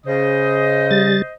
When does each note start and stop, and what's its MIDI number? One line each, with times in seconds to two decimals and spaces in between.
0.06 1.19 49
0.06 1.34 72
0.06 1.34 75
0.91 1.22 55
0.91 1.22 93